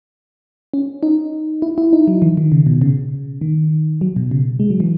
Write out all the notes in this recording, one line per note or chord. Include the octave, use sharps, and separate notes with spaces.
C#4
D#4
E4
E4
D#4
F#3
E3
D#3
C#3
B2
C#3
D#3
F#3
B2
C#3
G#3
F#3
E3